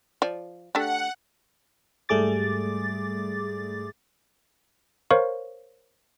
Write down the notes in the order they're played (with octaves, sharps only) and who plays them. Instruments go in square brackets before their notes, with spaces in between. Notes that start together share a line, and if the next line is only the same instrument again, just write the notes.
[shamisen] F3 D5
[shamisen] A3 D4 G4 [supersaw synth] F#5
[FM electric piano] G#2 G3 A3 G#4 D6 A6
[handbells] A#4 C5 C#5 F5 C#6